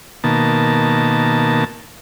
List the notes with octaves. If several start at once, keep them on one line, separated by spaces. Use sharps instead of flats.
B2 D#3 A#3 A5